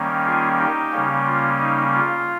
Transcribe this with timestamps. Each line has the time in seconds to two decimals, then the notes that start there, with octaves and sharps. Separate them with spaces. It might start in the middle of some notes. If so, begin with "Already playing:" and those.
Already playing: D#3 G3 A#3 C#4
0.25 F4 G#4
0.59 D#4 G4
0.92 C#3 G3 A#3 C#4
1.26 F4
1.60 D#4
1.94 F4